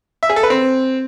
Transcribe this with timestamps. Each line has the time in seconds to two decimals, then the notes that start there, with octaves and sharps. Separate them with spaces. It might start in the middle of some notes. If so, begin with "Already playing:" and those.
0.23 E5
0.29 G#4
0.36 A4
0.43 B4
0.50 C4